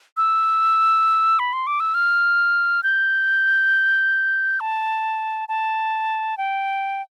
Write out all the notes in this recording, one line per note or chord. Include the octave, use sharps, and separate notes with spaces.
E6
B5
C6
D6
E6
F6
G6
A5
A5
G5